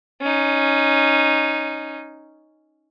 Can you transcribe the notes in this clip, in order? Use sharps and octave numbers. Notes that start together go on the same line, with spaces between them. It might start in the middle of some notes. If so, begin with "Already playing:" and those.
C#4 D#4